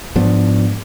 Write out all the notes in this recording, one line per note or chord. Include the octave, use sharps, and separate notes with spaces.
G#2 F3 B3 D4